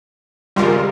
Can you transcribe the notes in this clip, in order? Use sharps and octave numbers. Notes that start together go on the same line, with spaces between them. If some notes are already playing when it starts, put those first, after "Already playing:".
G#1 C#2 G3 F4 A#4 C6